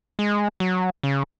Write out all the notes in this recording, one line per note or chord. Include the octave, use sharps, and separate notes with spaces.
G#3
F#3
C#3